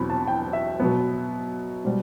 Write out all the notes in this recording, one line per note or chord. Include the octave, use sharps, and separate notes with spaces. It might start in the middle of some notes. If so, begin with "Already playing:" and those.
Already playing: E2 B2 F#3 C4 B5
A5
G5
E5
B2 F#3 B3
B2 G3 C5